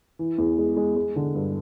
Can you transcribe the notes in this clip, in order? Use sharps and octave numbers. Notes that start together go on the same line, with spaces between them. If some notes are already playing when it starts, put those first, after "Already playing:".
E3
E2
G#3
G#3
G#3
D3
G2